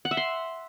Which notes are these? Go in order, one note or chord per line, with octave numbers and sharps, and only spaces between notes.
F#5
E5
C6